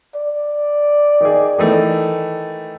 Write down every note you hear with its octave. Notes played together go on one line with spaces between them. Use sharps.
D5
D#3 G#4
D#3 E3 A3